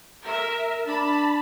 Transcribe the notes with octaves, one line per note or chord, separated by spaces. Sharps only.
A#4 E5
D4 A5 B5